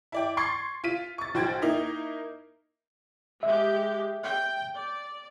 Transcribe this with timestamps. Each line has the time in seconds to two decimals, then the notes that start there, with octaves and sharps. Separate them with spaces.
0.12 E4 D5 G5
0.37 C6 C#6 G#6 A6 C7
0.84 F4 B6 D#7
1.18 C#6 A6
1.34 B1 F#4 C5 G5 G#6 A6
1.62 A#3 D#4 E4
3.43 G#3 G4 E5
4.25 G5
4.74 D5